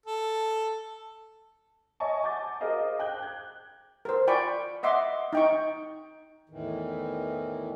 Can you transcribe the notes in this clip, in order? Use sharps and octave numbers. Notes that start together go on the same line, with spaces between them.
A4
C#5 D#5 E5 G#5 A5 C#6
F#5 G#5 D6 G6 A6
F#4 G#4 A#4 C5 D#5 F5
G5 F#6 G6
G#6
A#4 C5
F4 D5 G5 G#5 B5 C#6
D#5 E5 F#5 C6 D6
D#4 G5 C#6
E2 A2 D#3 E3